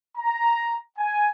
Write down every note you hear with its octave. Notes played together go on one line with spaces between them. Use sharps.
A#5
G#5